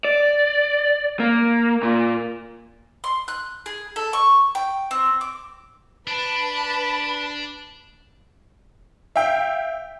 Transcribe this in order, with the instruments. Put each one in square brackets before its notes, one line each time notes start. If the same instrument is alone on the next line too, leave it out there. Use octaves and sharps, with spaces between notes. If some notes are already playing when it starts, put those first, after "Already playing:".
[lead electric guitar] D5
A#3
A#2
[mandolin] C6
F#6
G#4
A4
C#6
G5
C4
D6
[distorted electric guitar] D4 [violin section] B4 A5 [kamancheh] B5
[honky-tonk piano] E5 F5 G5